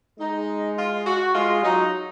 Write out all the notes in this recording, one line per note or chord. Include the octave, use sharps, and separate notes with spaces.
G#3 D#4
F4
F#4
G#3 F4
F#3 D#4